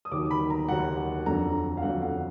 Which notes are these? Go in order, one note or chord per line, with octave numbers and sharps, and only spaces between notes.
D#6
D#2 D#3 F#3 D6
B5
A#5
D#2 D#3 F#3 F#5
F2 D3 F#3 A#5
F5
F2 D3 F#3 F#5
F#5